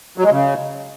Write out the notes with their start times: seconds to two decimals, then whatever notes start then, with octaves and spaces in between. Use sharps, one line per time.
0.18 F#3
0.24 G#3
0.31 C#3